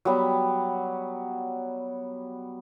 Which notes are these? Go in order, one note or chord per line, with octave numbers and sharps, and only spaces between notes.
F#3 G3 B3